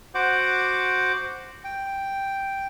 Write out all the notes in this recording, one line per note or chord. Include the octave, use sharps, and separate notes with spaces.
F#4 C5 F#5 D6
G5